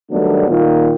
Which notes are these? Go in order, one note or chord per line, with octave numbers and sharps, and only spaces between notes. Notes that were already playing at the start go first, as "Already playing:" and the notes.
D#3 F#3 G3 A3 B3 D4
A#2 D#3 F4